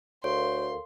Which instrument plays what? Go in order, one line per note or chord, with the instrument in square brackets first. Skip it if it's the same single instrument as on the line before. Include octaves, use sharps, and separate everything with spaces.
[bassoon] D2 [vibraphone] A4 A#4 F5 [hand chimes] C#5 [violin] C6